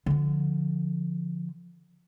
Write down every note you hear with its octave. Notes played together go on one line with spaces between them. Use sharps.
D3 F3